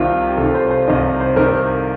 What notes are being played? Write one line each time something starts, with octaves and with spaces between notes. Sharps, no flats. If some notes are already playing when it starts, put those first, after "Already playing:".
Already playing: C2 C3 D#3 F4
G4
C2 C3 D#3 A4
C5
C5
C2 C3 D#3 D#5
C5
C2 C3 D#3 A#4